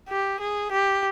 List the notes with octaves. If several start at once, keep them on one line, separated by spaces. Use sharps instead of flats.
G4
G#4
G4